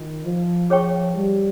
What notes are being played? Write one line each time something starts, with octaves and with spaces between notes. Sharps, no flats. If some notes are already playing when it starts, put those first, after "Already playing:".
Already playing: D#3 F4
F3
F3 G#4 C#5 G5 C#6
G3